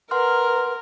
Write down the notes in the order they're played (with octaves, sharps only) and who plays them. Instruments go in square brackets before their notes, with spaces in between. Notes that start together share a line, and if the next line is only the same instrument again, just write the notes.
[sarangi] A#4 [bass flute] B4 [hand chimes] F#5 C6 F6